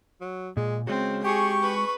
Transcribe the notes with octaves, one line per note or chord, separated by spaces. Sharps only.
F#3
A#2 G#3
C#3 G#3 C4 F#4
G4 G#4 C#6
B4